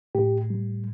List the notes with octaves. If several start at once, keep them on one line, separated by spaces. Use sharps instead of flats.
A2 G4
G3